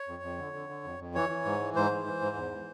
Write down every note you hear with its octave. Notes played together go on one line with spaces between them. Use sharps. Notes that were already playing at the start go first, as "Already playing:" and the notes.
Already playing: C#5
F2
F2
D3
D3
D3
F2
F2
E3 C#5
E3
G#2
E3
G#2 C5
E3
E3
G#2
E2
E3